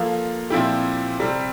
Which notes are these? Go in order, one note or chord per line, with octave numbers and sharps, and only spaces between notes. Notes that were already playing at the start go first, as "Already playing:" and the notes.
Already playing: F3 A#3 F4 A4
A#2 F3 C4 E4 G4
C3 G3 C4